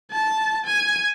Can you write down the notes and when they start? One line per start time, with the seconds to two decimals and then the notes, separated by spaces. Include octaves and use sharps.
0.11 A5
0.66 G#5